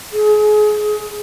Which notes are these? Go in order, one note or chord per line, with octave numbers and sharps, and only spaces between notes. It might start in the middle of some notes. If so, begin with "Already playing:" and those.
G#4